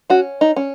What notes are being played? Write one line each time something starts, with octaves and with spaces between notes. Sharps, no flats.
C#4 F#4
D#4
C#4